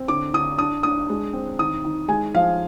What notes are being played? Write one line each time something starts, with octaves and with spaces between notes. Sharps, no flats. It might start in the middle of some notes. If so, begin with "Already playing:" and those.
Already playing: C4
D3 D6
D3 D#6
D4 D#6
D4 D#6
G#3
C4
D#3 D#6
D#3
G#3 G#5
F3 F5